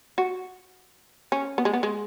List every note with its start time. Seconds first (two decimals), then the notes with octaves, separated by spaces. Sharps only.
0.18 F#4
1.32 C#4
1.58 B3
1.65 G#3
1.73 B3
1.83 G#3